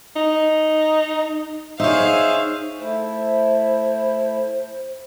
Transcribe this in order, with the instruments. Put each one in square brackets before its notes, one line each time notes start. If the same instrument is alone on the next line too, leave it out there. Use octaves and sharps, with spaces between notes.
[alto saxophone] D#4
[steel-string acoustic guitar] D#4 C#5 [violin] G#4 F5 [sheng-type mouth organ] C5 E5
[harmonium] A3 E4 [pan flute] C5